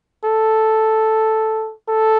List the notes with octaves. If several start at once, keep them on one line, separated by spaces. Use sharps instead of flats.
A4
A4